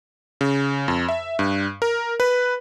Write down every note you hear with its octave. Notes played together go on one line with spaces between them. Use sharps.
C#3
F2
E5
G2
A#4
B4